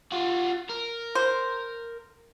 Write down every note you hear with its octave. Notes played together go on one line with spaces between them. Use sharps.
F4 F#4
A#4
C5